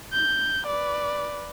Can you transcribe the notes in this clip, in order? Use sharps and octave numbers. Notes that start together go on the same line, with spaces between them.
G6
B4 D5